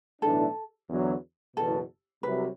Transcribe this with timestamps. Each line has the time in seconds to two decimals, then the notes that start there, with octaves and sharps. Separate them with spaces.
0.22 B1 A2 E3 A3 D4 A4
0.89 E2 D3 F#3
1.56 F#1 E2 B2 A4
2.23 C2 C3 F#3 B4